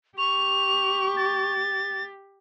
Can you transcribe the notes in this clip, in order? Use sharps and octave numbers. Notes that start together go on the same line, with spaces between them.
G4 C#6 F7
A6